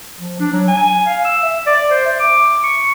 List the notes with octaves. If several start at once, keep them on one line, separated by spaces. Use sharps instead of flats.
F3
D4
F#3
G#5
F5
E6
E5
D5
C5
E5
D6
C#6